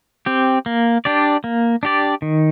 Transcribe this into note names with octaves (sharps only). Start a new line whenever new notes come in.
C4 G4
A#3
D4 G4 D5
A#3
D4 G4 D5
D#3